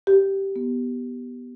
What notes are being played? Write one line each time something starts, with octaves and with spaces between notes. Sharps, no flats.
G4
B3